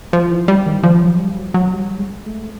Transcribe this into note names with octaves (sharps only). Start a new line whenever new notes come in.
F3
E3
G3
D#3
F3
F#3
G3
F#3
F#3
G3
G#3
A3